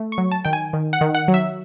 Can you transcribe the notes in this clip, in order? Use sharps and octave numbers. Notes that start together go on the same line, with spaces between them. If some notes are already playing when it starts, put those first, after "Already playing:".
Already playing: A3
C#6
F#3
A5
D#3 G5
G#5
D#3
F#5
D#3
F#5
F#3
E5